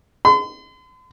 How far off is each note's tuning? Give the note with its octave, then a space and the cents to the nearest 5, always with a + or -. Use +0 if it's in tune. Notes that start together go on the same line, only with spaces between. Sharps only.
C6 -45